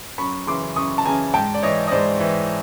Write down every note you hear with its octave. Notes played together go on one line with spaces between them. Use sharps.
F#2 B5 C#6
C#3 E3 C6 D6
F#2 C#6 D#6
A5
C#3 E3 G#5 A#5
G#2 G5 A5
D5
E3 C#5 D#5
D#5
G#2 C5 D5
E3